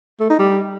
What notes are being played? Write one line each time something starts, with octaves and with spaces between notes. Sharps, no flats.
A3
D#4
G3